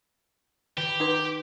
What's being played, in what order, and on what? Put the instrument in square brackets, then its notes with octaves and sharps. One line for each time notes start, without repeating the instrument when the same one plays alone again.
[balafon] D#3 [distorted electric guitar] G4
[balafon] D#4 B4